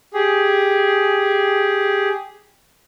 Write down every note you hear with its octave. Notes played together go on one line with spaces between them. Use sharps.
G4 G#4